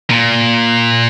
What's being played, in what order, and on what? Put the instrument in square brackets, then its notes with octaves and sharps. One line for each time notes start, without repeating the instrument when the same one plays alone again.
[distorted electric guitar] A#2